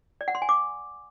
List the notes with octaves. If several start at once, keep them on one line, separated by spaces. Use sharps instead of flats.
D5
F#5
C6
G#5
D6